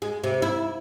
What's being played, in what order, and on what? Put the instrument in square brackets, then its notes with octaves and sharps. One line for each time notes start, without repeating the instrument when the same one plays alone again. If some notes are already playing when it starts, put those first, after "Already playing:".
[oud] G#3
C3
E4